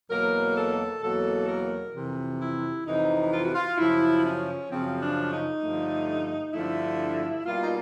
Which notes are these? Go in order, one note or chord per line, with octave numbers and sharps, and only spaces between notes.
E2 B2 F#3 A#3 A#4
A4
E2 B2 F#3 A#3 A4
A#4
F2 C3 E3
E4
F2 C3 E3 D#4
F4
F#4
F4
F#2 C#3 F3 E4
C#4
F#2 C#3 F3 C4
D4
D#4
G2 D3 F3 A3
G2 D3 F3 A3 E4
B2 G3 A#3 F4
D#4